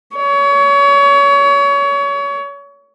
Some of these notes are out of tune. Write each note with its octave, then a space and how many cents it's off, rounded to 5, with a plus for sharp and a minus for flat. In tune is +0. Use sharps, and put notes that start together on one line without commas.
C#5 +30